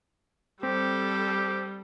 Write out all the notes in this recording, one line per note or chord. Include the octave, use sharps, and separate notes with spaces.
G3 C4 G4 A4